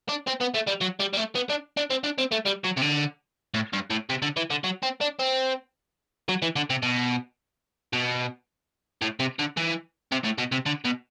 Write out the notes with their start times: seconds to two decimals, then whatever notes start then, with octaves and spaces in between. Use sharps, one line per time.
0.08 D4
0.27 C4
0.40 B3
0.54 A3
0.67 G3
0.81 F#3
1.00 G3
1.13 G3
1.17 A3
1.35 B3
1.49 D4
1.77 D4
1.90 C4
2.04 D4
2.18 C4
2.31 A3
2.45 G3
2.64 F#3
2.77 C3
2.82 D3
3.54 A2
3.73 G2
3.90 A2
4.10 C3
4.22 D3
4.37 E3
4.50 D3
4.64 F#3
4.83 C4
5.01 D4
5.19 C4
6.29 F#3
6.42 E3
6.56 D3
6.70 C3
6.83 B2
7.93 B2
9.02 A2
9.20 C3
9.39 D3
9.57 E3
10.12 C3
10.24 A2
10.38 B2
10.52 C3
10.66 D3
10.84 B2